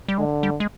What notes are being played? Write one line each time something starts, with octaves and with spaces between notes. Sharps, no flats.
G3
D3 G#3
G3
G#3